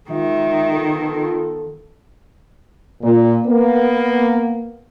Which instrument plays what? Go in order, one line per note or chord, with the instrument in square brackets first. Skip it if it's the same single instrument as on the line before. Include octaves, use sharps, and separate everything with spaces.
[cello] D#3 [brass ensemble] G#3 F4 E5
[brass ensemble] B3 F4 A4
[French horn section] A#2
A#3 B3